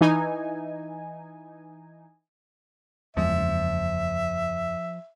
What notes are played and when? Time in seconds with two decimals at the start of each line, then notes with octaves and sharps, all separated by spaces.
0.01 E3 D#4 G#5
3.17 F#1 E2 F3 G#3 E5